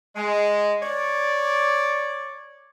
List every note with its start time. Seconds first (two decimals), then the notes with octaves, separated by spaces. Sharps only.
0.16 G#3
0.82 C#5 D5